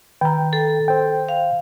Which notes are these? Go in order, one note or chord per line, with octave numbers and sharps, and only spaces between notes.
D#3 G5 A#5
A4
C5 G5
F5